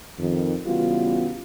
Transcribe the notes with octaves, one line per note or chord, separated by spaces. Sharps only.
F2 D#3
C#3 E3 G3 B3 F4 F#4